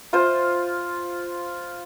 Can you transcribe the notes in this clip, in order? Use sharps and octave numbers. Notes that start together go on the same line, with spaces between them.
F4 C5